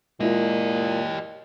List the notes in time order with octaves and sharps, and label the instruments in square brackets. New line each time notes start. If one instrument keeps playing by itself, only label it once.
[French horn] A#2 [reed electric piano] G#3 E4 F4 [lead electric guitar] G4 D#5